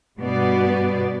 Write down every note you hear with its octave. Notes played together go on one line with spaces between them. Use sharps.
G2 B2 B3 D5